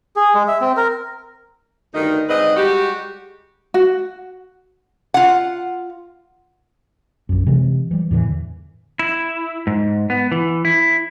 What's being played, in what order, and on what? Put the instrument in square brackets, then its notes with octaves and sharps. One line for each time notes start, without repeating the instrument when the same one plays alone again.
[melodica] G#4
G#3
E5
C4
A#4
[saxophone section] D2 G2 D#3 D#4
G#2 D3 C4 B4 D#5
G3 G#3 F#4 G4
[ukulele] F#4
[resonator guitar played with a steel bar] F4 F#5
[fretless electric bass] A#1 F#2
C3 E3 G#3 C4
E3 G3
E2 A2 D3 E3
[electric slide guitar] E4
G#2
B3
E3
E4